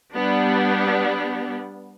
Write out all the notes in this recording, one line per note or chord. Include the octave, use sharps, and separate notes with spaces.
G3 B3 D4